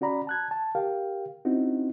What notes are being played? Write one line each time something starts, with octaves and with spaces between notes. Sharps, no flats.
C#4 F#4 D5 A#5 B5
A5 F#6 G#6
A5
G4 A#4 F5 G5
C4 C#4 D#4 E4 F#4